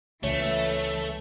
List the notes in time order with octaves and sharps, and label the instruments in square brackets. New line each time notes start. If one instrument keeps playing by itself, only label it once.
[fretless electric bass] C#2 [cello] E3 [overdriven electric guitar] A3 [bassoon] C#4